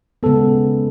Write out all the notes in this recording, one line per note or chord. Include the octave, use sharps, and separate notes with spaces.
C#3 G#3 B3 A4